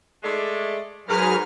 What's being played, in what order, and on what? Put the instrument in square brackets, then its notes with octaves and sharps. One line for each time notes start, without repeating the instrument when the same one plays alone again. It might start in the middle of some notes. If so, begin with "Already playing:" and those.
[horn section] G#3 A3 D5
[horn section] G#2 A#4 B4 [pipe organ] F#3 G#4 F6